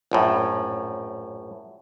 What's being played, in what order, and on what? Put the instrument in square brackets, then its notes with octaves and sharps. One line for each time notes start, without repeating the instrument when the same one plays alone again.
[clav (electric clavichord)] A#1 F#2 A2